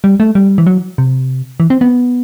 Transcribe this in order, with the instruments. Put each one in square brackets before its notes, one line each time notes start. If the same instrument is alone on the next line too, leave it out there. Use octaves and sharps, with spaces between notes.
[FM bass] G3
A3
G3
E3
F#3
C3
E3
C4
B3